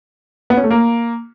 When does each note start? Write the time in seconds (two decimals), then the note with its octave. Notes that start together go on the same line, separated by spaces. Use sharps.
0.50 B3
0.57 C#4
0.64 A3
0.70 A#3